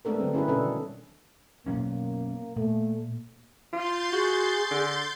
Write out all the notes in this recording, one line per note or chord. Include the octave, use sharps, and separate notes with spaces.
G#3 A3 B3 D4 A4 A#4
D3 F#3 G3 C4
C#4 E4 G#4 A#4 B4
B2 C#4 D4 A4
D#3
B2 F#3 A#3 C#4
A#2 A3
F4 C6 G6 A6
F#4 G#4
D3